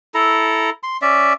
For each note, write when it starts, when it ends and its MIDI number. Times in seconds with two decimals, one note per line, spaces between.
0.14 0.70 64
0.14 0.70 69
0.14 0.70 82
0.83 0.97 84
1.02 1.33 61
1.02 1.33 74
1.02 1.33 76